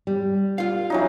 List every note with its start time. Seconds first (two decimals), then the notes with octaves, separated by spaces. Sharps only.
0.07 G3
0.58 F4 F5
0.90 E3 F#3 D#4